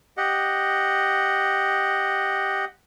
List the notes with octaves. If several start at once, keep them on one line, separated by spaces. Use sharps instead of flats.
G4 D#5 F#5